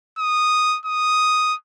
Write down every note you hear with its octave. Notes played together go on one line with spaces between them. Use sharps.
D#6
D#6